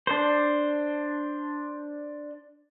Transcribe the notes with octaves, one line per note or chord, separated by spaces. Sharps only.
D4 C5